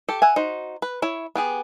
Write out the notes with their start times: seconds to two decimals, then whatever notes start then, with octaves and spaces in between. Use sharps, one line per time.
0.09 G4 A4
0.22 E5 F#5 G#5
0.36 D#4 F#4 C5
0.82 B4
1.02 E4 C#5
1.35 B3 G4 G#4